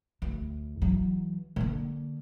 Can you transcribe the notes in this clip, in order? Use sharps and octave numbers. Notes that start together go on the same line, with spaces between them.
D2
E3 F#3
D3 A#3